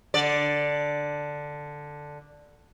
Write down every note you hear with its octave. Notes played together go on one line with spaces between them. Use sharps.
D3 D5